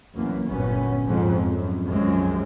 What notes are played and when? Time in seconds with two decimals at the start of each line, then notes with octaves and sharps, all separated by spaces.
0.15 C2 F#2 A2 E3 A#3 B3
0.47 G1 C2 F#2 A#2 B3 C#4
1.07 F2 G#2
1.52 F#2
1.86 C2 F#2 D#3 F3 G#3 C4